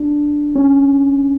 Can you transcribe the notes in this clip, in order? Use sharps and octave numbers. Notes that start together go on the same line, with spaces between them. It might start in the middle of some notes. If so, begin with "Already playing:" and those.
Already playing: D4
C#4